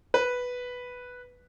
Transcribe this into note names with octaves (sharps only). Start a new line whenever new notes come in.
B4